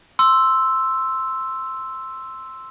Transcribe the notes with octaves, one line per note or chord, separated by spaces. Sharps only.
C6 E6